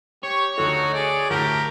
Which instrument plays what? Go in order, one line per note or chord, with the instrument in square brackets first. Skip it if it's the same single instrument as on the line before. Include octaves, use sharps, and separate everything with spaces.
[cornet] G4 [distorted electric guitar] C#5 [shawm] C#6
[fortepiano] D2 A4 [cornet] D#4 [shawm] F#4
[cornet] G#4 [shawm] D5
[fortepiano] D2 A2 [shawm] G4 [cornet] A#4